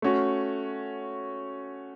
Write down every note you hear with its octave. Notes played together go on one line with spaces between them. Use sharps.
A3 C#4 F#4